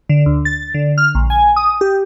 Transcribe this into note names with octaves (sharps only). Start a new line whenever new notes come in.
D3
D2
A6
D3
F6
A#1
G#5
D#6
G4